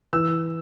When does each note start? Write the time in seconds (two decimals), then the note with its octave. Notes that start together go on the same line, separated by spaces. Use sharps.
0.13 E3 E6